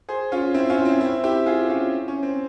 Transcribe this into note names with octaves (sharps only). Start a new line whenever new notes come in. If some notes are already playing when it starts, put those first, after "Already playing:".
G#4 C5
C#4 F4
C4 E4
C#4 F4
C4 E4
C4 E4
E4 G4
F4 G#4
C#4 F4
C#4
C4